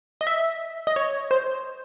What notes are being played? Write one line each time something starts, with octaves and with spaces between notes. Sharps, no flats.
D#5
E5
D#5
C#5
C5